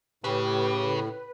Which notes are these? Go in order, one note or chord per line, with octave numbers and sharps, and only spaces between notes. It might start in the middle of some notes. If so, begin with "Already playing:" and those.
A2 C#3 G4 B4